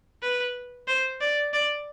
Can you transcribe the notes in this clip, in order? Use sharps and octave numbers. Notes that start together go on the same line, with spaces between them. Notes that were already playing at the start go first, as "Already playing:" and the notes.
B4
C5
D5
D5